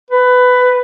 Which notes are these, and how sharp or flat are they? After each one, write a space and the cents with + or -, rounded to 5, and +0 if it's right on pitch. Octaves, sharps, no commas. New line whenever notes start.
B4 +15